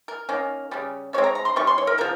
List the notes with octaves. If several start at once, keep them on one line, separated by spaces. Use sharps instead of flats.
A#4
D#3 A#3 C#4
C#3 G3 C#4
D#3 G#3 C4 C#5
A#5
A#5
C6
D#3 G3 C#4 C#6
C6
C#5
A#4
C#3 F3 A#4